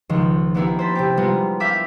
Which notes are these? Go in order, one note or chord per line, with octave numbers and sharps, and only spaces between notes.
C#2 D#3 F3 G#3
A#3 B3 D4 E4 G4 G#4
C5 A5 B5
C3 G4
G3 G#3 B3 F4 A#4
E5 F5 D6 G6 B6